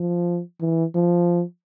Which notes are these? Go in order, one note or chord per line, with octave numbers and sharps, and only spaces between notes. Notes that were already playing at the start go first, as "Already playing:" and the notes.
Already playing: F3
E3
F3